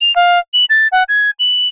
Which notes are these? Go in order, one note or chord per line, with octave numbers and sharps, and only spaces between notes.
F7
F5
F#7
A6
F#5
G#6
F#7